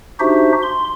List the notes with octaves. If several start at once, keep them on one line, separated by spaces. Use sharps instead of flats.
D4 D#4 F#4 G4 C5 E5
C6